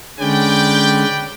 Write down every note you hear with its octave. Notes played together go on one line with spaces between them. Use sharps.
D3 G#3 C#4 B4 D5 G5